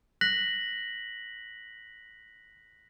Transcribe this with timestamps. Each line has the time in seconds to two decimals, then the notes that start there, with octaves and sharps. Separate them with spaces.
0.21 F#6 A#6 B6 F#7